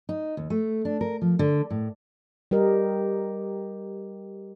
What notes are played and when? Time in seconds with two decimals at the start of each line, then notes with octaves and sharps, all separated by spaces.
0.09 D#4
0.37 D#2
0.50 A3
0.85 D4
1.01 A#4
1.22 F3
1.39 D3
1.71 A2
2.51 G3 G4 A#4 D#5